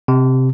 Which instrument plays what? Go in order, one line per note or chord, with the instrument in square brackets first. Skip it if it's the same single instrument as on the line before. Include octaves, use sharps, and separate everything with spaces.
[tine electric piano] C3